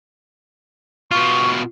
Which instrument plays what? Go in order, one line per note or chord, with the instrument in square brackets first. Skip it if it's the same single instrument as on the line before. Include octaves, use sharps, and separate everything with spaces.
[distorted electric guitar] B2 F4 [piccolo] C#6